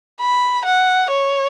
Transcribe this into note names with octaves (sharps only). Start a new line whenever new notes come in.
B5
F#5
C#5